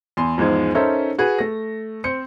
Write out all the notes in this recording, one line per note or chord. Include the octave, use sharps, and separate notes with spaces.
E2 C6
E2 G#2 F3 G#3
C#4 D#4 A4 A#4 C5 E5
F#4 G#4 B4
A3 A#6
C4 C5 C#7